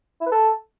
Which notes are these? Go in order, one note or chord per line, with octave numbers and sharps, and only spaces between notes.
E4
B4
A4